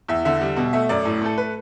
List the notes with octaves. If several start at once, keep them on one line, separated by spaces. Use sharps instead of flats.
E2 E5
D3 E5
G3
B2
A3 E5
F#2 D5
A2
A3 A4
B4